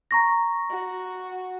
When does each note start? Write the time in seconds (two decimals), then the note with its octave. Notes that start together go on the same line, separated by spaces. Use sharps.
0.11 A#5 C#6 A#6
0.71 F#4